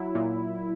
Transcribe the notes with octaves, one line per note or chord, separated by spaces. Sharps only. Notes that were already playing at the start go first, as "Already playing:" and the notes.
Already playing: F#3 E4
A#2